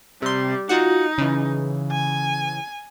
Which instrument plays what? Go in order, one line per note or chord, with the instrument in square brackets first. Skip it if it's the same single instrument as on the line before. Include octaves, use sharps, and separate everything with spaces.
[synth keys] C3 C6 [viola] G3
[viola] D#4 [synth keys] F4 F#4 F#5
[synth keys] C#3 E3
[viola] G#5